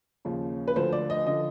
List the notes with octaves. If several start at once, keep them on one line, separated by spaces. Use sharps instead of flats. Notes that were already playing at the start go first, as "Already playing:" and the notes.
D#2 C#3 F3
B4
D2 D3 F3 C5
D5
D#5
D3 F3 D#5